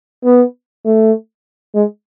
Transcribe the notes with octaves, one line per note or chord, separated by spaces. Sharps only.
B3
A3
G#3